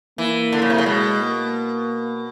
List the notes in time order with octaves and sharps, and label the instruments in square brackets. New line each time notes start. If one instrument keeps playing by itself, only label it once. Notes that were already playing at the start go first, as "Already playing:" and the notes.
[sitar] E3 [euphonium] A#3
[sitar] D3
C#3
C3
C#3
[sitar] B2 [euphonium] G#3
[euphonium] A#3